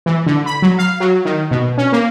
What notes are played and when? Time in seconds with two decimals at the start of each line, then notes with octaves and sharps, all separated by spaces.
0.06 E3
0.26 D3
0.46 B5
0.62 F#3
0.79 F5
1.00 F#3
1.25 D#3
1.51 B2
1.78 C#4
1.93 A#3